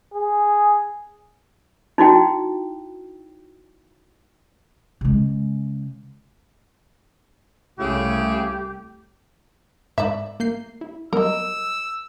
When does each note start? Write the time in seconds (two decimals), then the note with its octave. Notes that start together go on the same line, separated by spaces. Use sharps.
0.14 G#4
1.98 D#4 E4 F#4 G5
5.01 C#3 G#3
7.79 C2 C#3 A3 E4 G4
9.98 G#2 D5 E5
10.40 A#3 G6 C7
10.81 E4
11.13 F#3 G3 B3 A#4 D#5 E6